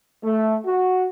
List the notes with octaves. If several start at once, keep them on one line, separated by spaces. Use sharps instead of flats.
A3
F#4